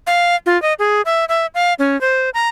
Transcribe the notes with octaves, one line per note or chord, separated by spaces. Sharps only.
F5
F4
D#5
G#4
E5
E5
F5
C#4
C5
A#5